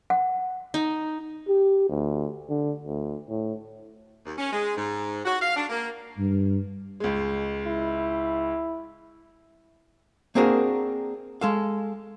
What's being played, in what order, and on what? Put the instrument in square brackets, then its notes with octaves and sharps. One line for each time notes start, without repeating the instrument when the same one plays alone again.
[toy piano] F#5
[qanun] D#4
[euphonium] G4
D2
D3
D2
A2
[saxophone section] D#2
C#4
G#3
G#2
F#4
F5
D4
A#3
[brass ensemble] G2
[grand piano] C#2 G#3
[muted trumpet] E4
[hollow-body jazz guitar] A#3 C4 D4 F#4 G#4 A#4
G#3 A4 F5